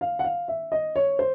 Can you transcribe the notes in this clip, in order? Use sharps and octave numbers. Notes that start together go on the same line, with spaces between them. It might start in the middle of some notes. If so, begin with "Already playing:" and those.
F5
F#5
F5
E5
D#5
C#5
C5